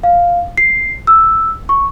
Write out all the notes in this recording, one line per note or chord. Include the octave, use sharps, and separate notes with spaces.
F5
C7
E6
C#6